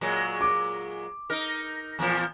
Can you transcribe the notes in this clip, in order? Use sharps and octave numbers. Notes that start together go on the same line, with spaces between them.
A#2 F#3 G#3
D6
D#4 A#4
E2 A#2 F3